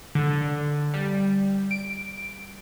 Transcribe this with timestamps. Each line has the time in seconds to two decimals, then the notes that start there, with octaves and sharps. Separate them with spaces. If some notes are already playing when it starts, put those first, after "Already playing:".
0.15 D3
0.94 G3
1.71 D7